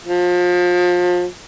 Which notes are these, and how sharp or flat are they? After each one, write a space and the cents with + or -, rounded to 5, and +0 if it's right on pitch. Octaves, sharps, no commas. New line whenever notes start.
F3 +30